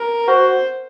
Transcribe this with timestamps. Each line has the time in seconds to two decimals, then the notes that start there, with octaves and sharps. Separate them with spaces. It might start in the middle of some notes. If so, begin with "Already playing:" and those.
Already playing: A#4
0.28 F#4 C5